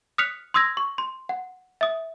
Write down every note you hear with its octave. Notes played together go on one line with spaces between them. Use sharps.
D#6 F6 F#6 B6 C#7 F7
C6 D#6 E6 G#6 A#6
C#6
C6
F#5
E5 D#6